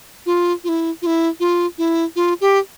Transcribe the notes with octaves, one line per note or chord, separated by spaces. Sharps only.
F4
F4
E4
F4
E4
F4
E4
F4
G4